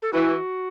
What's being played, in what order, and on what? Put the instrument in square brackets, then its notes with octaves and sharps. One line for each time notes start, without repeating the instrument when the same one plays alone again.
[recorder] A4
[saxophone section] E3 [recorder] F#4